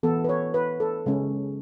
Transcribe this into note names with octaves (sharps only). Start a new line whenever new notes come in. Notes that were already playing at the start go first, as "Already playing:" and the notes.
E3 B3 A4
B4
C#5
B4
A4
C#3 G#3 C#4